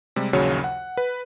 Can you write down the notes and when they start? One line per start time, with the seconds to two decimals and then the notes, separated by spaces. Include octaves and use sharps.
0.16 C3 G3 G#3
0.33 A#1 D#2 C#3 F#3 F#4 C#5
0.64 F#5
0.97 B4